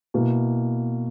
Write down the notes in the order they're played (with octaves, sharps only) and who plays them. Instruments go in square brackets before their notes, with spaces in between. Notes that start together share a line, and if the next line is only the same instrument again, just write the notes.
[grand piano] B2 A#3 E4